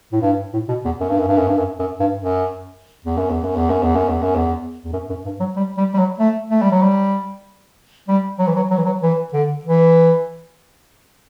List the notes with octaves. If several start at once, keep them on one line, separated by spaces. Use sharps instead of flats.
A2
G2
A2
B2
E2
F#2
G2
F#2
G2
F#2
G2
F#2
F#2
G2
F#2
E2
F#2
E2
F#2
E2
F#2
E2
F#2
E2
F#2
E2
E2
F#2
F#2
G2
F#3
G3
G3
G3
F#3
A3
A3
G3
F#3
G3
G3
F#3
E3
F#3
F#3
E3
F#3
E3
D3
E3